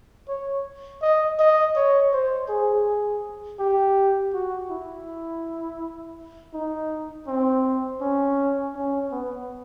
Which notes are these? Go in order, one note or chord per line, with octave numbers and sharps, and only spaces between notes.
C#5
D#5
D#5
C#5
C5
G#4
G4
F#4
E4
D#4
C4
C#4
C#4
B3